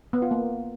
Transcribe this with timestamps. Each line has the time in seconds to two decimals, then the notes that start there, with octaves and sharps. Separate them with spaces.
0.13 B3
0.22 F4
0.31 A#3